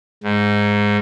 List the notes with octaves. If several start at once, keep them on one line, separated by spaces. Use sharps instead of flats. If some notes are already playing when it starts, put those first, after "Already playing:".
G#2